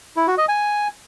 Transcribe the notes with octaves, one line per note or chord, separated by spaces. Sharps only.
E4
F#4
D#5
G#5